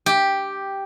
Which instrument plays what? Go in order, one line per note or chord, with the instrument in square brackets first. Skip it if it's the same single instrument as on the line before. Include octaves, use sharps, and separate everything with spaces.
[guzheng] G4